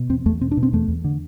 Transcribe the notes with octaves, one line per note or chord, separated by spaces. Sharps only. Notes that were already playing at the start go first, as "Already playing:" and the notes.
Already playing: B2
E2 C4
E2 A3
B2 C4
D4
B2
C4
E2 A3
E2
D3